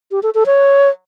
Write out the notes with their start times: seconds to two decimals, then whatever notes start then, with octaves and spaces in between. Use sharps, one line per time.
0.11 G4
0.23 A4
0.35 A4
0.46 C#5